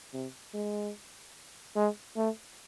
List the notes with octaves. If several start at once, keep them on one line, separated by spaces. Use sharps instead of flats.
C3
G#3
G#3
A3